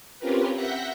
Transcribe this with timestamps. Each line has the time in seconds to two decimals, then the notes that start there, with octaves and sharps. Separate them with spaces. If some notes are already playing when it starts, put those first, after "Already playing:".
0.19 C4 C#4 F4 G4 A#4 B4
0.56 E5 F#5 F#6 G6 A#6 B6